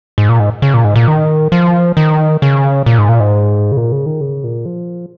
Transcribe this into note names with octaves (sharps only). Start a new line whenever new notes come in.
G#2
A#2
G#2
C#3
A#2
G#2
A#2
D#3
F3
D#3
C#3
A#2
G#2
A#2
G#2
C#3
A#2
C#3
D#3
C#3
A#2
F3